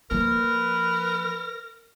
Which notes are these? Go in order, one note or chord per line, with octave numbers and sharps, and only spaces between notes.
F3 A#3 A#4 B4